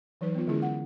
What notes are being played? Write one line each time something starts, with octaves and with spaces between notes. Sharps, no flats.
E3 F#3 D#4 B4
B3 F4
D3 G#3 C#4 E4 G#4
F#5